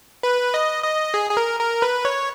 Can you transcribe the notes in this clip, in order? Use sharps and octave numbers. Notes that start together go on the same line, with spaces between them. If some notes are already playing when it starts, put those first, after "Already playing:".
B4
D#5
D#5
G#4
G#4
A#4
A#4
B4
C#5